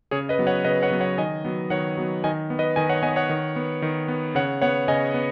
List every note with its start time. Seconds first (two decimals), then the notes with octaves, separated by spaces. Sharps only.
0.11 C#3 G#4 C#5
0.29 B4 D#5
0.39 F#3 B3
0.47 C#5 F#5
0.65 C#3 B4 D#5
0.83 C#5 F#5
0.91 F#3 B3
1.01 C#5 F#5
1.18 D#3 D#5 G#5
1.45 F#3 B3
1.70 D#3 C#5 F#5
1.97 F#3 B3
2.24 D#3 D#5 G#5
2.50 B3
2.59 B4 D#5
2.76 D#3 D#5 G#5
2.89 C#5 F#5
3.02 B3 D#5 G#5
3.16 C#5 F#5
3.29 D#3
3.56 B3
3.82 D#3
4.08 B3
4.35 C#3 C#5 F#5
4.62 B3 C#5 F#5
4.88 C#3 D#5 G#5
5.14 B3